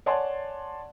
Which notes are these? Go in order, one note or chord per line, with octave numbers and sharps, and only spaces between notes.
C#5 D5 F#5 G#5 A5 C6